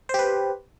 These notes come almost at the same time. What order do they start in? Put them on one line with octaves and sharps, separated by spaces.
C5 G4 B4